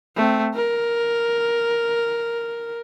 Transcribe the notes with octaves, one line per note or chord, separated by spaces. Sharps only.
A3 C4
A#4